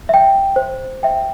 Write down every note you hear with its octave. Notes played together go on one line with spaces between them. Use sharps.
E5 G5
C5
E5 G5